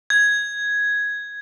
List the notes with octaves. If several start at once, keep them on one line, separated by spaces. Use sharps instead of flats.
G#6